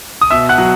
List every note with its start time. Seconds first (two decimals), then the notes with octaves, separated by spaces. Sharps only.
0.21 D#6
0.30 B2 E5 E6
0.49 F#5 F#6
0.58 F#3